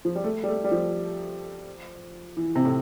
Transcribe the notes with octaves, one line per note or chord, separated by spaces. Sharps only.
F3
G3
A3
G3
A3
G3
F3
E3
C3
A2